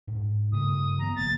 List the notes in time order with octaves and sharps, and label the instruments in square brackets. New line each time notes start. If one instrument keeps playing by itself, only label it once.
[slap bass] G#2
[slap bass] G2 C#3 A3 [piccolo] D#6
[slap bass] E3 B3 [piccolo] A#5
[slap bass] F#1 F3 A#3 [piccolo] A6